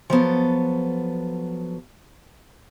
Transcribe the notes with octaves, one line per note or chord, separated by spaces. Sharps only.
F3 F#3 B3 A4